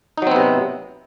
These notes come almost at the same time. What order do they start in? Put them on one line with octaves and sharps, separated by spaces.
D#4 F#3 C4 B3 C3